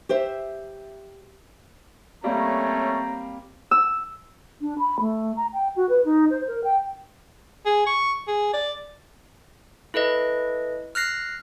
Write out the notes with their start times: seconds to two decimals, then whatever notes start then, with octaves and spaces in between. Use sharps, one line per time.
0.09 G4 C5 E5
2.24 G3 A3 A#3 C4 C#4 C#5 A#5
3.71 E6
4.61 D4
4.79 B5
5.00 A3
5.37 A#5
5.53 G5
5.76 F#4
5.89 B4
6.05 D#4
6.30 C5
6.48 A#4
6.64 G5
7.66 G#4
7.86 C#6
8.28 G#4
8.53 D5
9.94 E4 A4 B4 D#5
10.95 F6 F#6 A#6 C7